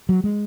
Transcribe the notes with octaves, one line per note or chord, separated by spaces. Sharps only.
F#3
G#3